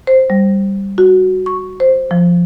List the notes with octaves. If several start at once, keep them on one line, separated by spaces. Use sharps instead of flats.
C5
G3
F#4
C#6
C5
F3